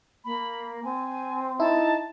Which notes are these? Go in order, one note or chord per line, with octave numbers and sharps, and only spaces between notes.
A#3 B5
C4 G#5
D#4 E4 A5